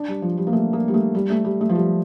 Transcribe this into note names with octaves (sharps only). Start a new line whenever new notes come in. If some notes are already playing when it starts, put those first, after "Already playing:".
Already playing: D4
G3
F3
G3
A#3
A3
A#3
G3
A3
G3
A3
G3
A3
F3
G3